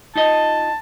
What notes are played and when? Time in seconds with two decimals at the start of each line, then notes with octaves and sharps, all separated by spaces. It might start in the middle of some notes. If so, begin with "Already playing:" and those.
0.16 D#4 F4 D#5 A5